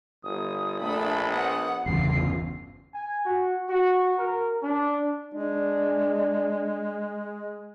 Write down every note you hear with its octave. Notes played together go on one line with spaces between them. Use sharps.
G1 D#6
A#1 A3 D4 B5
B3 F#5 D#6
G1 E2 C#3 F4 C7
G#5
F#4
F#4
A#4
D4
G#3 D4